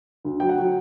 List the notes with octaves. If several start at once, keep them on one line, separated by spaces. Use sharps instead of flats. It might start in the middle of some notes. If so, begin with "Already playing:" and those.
D2
F#3 G5
F#5
F#3